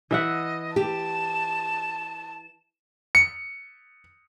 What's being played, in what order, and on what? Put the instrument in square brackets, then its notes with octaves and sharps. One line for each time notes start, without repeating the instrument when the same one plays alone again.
[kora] E3 E5 F#5 [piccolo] D#5
[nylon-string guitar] G4 [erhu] A5 [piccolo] E7
[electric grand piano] C#7